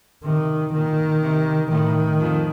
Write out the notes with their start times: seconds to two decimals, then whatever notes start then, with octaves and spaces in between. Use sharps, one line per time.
0.25 C3 D#3
0.73 A#2 D#3
1.23 C3
1.71 A2 D#3
2.20 F2